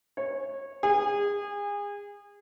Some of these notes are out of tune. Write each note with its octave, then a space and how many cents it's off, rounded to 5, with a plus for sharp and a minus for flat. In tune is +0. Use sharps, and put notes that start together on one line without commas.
C#5 -20
G#4 -30